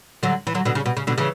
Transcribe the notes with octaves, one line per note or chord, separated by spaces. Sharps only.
D3 F#3
E3
D3 F#3
B2 D3
C#3
B2
C#3
B2 D3
C#3 E3